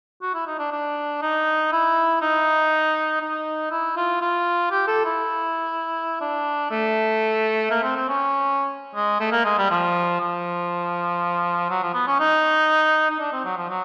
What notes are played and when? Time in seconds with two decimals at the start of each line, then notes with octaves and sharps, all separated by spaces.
0.22 F#4
0.34 E4
0.47 D#4
0.59 D4
0.72 D4
1.22 D#4
1.72 E4
2.22 D#4
3.21 D#4
3.71 E4
3.97 F4
4.21 F4
4.71 G4
4.87 A4
5.05 E4
6.21 D4
6.71 A3
7.71 A#3
7.83 C4
7.96 C4
8.09 C#4
8.95 G#3
9.20 A3
9.32 A#3
9.45 G#3
9.58 G3
9.71 F3
10.21 F3
11.70 F#3
11.83 F3
11.94 B3
12.07 C#4
12.20 D#4
13.10 D#4
13.20 D4
13.33 C4
13.45 F#3
13.57 F3
13.69 F#3